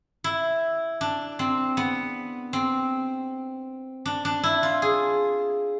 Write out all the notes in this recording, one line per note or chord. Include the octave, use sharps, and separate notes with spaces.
E4
D4
C4
B3
C4
D4
D4
E4
F4
G#4